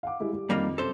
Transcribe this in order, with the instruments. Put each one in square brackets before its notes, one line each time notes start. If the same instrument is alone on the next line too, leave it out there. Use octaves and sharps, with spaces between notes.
[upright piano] F5 F#5 D6
G3 G#3 E4
G3
[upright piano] F2 D#3 [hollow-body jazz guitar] G3 A#3 D#4
[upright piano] F#2 C3 [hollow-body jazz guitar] A4 C5